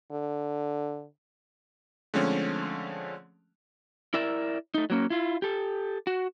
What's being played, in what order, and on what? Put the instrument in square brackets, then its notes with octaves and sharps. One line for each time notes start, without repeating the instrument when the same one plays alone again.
[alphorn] D3
[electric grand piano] D3 F3 G#3 A3 C4 C#4
[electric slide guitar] E4 A#4 D5 E5
A3 D#4
F#3 A#3 C#4
E4 F4
G4 A4
F#4